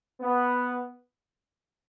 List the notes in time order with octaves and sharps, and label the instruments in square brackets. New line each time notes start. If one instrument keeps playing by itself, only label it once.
[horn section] B3